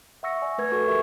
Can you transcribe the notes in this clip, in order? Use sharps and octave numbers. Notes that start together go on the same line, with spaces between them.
E5 F#5 C#6 E6 A#6 C#7
D5 G#5
A3 B4 G#6
F#4 A4 C#6
G4 A#4 E5 G#5 C#6